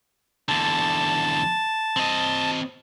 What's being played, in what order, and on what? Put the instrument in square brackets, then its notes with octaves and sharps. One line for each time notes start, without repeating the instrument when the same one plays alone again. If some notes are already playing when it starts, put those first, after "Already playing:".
[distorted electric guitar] E2 D3 [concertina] A5
[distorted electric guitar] C4 D#5